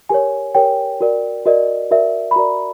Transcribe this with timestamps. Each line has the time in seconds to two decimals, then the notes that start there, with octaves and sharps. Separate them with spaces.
0.09 G4 A#4 C#5 G#5
0.55 G4 A#4 C#5 G5
1.00 F#4 A#4 D5
1.45 F#4 A#4 D5 D#5
1.91 F#4 A#4 D5 E5
2.31 B5
2.36 F#4 A#4 D5 A#5